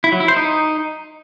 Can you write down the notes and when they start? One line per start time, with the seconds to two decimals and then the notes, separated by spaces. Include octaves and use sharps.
0.04 E4
0.12 F#3
0.20 E4
0.28 C5
0.37 D#4